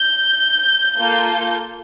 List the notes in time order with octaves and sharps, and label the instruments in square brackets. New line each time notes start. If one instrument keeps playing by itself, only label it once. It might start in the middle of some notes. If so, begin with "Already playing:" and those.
Already playing: [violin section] G6
A#3 F4 A4